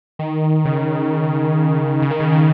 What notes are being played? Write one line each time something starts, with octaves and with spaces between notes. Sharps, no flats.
D#3
C#3
C#3
D#3
C#3
D#3